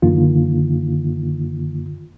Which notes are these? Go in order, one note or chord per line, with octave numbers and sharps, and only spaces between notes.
F#2 D3 D#3 A#3 F4